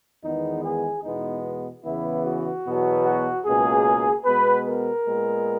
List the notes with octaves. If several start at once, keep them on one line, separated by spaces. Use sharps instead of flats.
E2 D#3 G#3 B3 D#4
G#4
E2 B2 G#3 B3 D#4
E2 C#3 E3 B3 E4
F#4
E2 B2 F#3 B3
F#4
C#2 B2 A#3 G#4
B2 G#3 B3 B4
A#4
A#2 G#3 B3